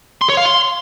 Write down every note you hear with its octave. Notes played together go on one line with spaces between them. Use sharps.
C6
C#5
F5
C6